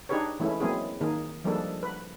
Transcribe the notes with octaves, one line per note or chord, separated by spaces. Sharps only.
D4 D#4 G4 G#4 B4 C#5
E3 G#3 A3 C#4 E4
F#3 G#3 A#3 C4 E4 G#4
D#3 A#3 D#4 G#4
F3 G3 G#3 A#3 D4 A4
B4